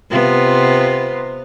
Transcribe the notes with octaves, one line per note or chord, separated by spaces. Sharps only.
C3 B3 F4